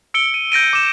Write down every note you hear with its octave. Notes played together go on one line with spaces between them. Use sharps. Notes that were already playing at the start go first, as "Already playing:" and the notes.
E6 C#7 D7 G7
D#7
G6 A#6 D7 D#7
D6 E7